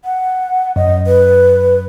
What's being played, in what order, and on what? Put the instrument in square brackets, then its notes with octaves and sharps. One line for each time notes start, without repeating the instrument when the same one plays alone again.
[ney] F#5
[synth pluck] F#2 [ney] D#5
[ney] B4